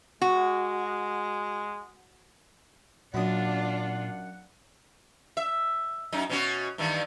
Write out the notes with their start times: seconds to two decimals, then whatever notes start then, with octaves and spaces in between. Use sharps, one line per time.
0.21 G#3 F#4
3.14 F#2 A#2 D4 F4 F#5 D#6
5.37 E5
6.12 F#2 D#4
6.30 B2 C#4 F#4
6.78 G2 D#3 E3